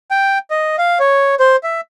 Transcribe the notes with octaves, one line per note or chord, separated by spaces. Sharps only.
G5
D#5
F5
C#5
C5
E5